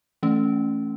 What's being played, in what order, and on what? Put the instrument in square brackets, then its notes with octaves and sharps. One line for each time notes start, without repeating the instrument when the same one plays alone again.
[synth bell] E3 A3 C#4